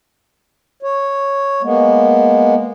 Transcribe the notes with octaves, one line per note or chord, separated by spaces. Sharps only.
C#5
G#3 A#3 B3